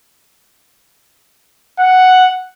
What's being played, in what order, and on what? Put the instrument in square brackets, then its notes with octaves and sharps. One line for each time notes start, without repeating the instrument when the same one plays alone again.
[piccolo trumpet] F#5